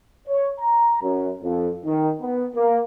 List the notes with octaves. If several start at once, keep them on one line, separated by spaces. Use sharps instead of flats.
C#5
A#5
F#2
F2
D#3
B3
A#3